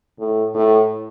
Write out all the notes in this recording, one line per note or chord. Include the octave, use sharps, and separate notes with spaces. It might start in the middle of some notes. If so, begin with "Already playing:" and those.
A2
A2